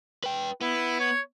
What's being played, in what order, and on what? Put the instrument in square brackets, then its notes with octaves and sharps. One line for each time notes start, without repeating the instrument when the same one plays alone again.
[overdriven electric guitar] B4 G5
[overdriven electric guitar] B3 [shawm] E4
[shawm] C#5